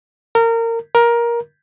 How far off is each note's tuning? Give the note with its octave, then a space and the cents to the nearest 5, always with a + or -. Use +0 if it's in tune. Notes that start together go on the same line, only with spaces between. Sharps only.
A#4 -25
A#4 +15